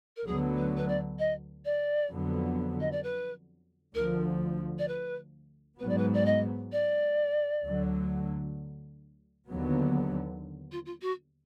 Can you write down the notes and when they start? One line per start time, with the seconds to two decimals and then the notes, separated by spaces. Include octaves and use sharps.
0.16 A#4
0.26 D2 D3 F#3 B3 G#4
0.57 B4
0.77 B4
0.88 D5
1.19 D#5
1.65 D5
2.11 F2 D3 F#3 B3
2.80 D#5
2.91 D5
3.03 B4
3.94 D2 D3 F3 A#4
4.78 D5
4.88 B4
5.79 G#2 F#3 B3 B4
5.89 D5
5.97 B4
6.14 D5
6.25 D#5
6.72 D5
7.64 D2 D3 F#3
9.48 D#2 D3 F#3 B3
10.71 F4
10.85 F4
11.01 F#4